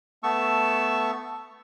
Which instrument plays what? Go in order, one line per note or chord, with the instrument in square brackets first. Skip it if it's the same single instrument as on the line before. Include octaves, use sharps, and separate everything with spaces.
[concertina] A3 B3 A5 C#6 E6